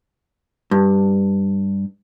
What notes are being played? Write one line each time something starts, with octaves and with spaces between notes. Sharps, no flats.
G2